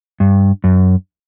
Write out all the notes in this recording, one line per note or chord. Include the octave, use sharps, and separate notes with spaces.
G2
F#2